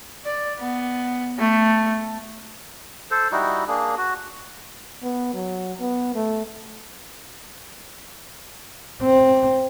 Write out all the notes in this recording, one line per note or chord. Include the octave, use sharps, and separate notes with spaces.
D5
B3
A3
A4 C5
G3 D#4 E4 F#4
A#3 D4 G#4
F#4
B3
F#3
B3
A3
C4